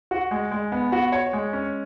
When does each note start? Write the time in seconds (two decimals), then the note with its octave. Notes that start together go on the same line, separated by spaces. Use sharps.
0.11 F#4
0.31 G#3
0.51 G#3
0.72 B3
0.92 F#4
1.12 C#5
1.33 G#3
1.53 C#4